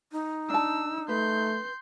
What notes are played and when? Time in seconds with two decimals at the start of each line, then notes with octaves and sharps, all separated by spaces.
0.12 D#4
0.50 D4 A5 E6
1.09 A3 B4 C6 G6